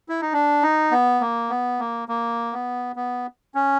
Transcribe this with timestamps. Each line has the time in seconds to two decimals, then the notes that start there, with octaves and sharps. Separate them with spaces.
0.09 E4
0.21 D#4
0.33 D4
0.63 D#4
0.92 B3
1.21 A#3
1.50 B3
1.79 A#3
2.08 A#3
2.53 B3
2.96 B3
3.55 C#4